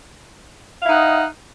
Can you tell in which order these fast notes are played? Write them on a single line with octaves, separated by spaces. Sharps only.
F5 E4 D#4 F#5 D#5